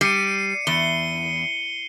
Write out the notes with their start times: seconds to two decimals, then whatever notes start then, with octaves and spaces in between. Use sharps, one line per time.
0.01 G3 C7 C#7 D#7
0.67 E2 C#7 G7